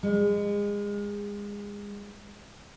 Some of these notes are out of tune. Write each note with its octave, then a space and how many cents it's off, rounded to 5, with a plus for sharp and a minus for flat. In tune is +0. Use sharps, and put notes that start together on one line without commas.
G#3 -25